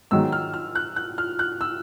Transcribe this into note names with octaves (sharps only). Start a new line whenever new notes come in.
G#2 D#3 F#3 E6
F6
F6
F#6
F#6
F6
F#6
E6